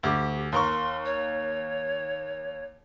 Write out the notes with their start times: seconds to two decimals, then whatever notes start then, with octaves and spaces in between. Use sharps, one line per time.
0.03 D2 G4 D6
0.52 D#2 A#4 C6 C#6
1.05 C#5